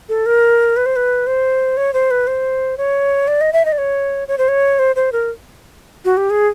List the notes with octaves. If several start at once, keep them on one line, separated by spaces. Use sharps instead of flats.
A4
A#4
B4
C5
B4
C5
C#5
C5
B4
C5
C#5
D5
D#5
E5
D#5
D5
C#5
C#5
C5
C#5
C5
C5
A#4
F#4
G4
G#4